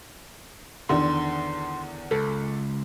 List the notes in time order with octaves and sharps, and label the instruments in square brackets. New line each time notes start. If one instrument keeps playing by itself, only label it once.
[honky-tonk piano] E2 D3 D#3 [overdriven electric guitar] C6
[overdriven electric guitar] C#2 [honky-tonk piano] A4